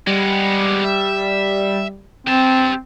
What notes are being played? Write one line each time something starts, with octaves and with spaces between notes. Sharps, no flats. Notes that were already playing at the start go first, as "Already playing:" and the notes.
G3 G#3 B3
E5
C4 G4 A5